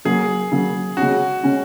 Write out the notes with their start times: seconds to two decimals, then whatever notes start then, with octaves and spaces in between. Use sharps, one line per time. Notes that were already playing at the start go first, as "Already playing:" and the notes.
0.05 C#3 F#3 A#3 G#4
0.52 C#3 F#3 A#3
0.97 C#3 G#3 C#4 F#4
1.43 C#3 G#3 C#4